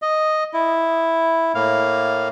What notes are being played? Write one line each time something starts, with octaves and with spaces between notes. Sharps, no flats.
D#5
E4
A2 A#3 F5